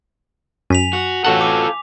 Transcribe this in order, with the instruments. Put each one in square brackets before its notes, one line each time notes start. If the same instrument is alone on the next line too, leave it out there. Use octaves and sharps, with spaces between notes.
[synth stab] F#2 [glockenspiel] G#5 B6 F7
[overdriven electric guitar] F#4
[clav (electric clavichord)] A1 F#4 F#5 [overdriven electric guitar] F4 A4
[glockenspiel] D6